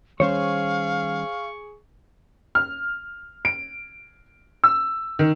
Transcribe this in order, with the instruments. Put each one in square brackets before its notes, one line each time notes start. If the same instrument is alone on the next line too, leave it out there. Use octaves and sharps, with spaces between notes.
[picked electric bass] D#3 G3 C#4 [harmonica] G#4 C#6 [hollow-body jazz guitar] C5 C#5 [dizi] F5
[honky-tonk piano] F6
D7
E6
D#3